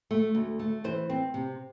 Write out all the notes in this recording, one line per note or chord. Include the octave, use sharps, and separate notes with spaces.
A3
D2
A3
E3 C5
C4
C3